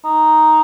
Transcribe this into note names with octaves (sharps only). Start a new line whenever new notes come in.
D#4